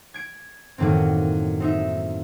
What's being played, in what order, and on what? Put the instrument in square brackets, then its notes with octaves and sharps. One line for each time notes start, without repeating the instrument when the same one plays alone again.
[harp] G#6 D7
F#2 A2 D#3 A#3 C4
C4 D#4 E5